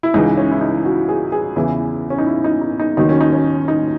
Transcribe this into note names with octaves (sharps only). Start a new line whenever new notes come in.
E4
C#2 C#3 E3 D#4
C#4
E4
D#4
F#4
G#4
G#4
E2 C#3 E3 E4
C#4
D#4
E4
D#4
D#4
D#4
D#2 D#3 F#3 D#4
C#4
D#4
C#4
D#4